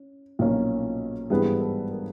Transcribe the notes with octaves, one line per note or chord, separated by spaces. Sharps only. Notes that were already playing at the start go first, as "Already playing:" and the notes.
Already playing: C#4
B1 A#2 F3 A#3 C#4
G#1 G2 E3 G3 B3 G#4
A4
A#4